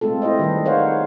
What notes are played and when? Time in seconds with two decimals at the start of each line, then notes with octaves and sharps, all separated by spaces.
0.01 G#3 A3 C4 F4 A4
0.22 E4 G4 C5 D#5
0.39 D#3 G3 B4
0.65 G#4 A#4 C5 C#5 F5 F#5